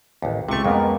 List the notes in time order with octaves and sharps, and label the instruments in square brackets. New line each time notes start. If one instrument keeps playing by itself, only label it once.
[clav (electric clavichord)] A1 D#2
[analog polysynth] C#2 C#6 [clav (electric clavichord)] C3 A3
[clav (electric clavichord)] F2 [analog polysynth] G#3 A#3 B3